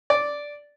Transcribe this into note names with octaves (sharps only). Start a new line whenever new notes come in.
D5